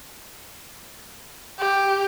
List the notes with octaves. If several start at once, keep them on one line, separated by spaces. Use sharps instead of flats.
G4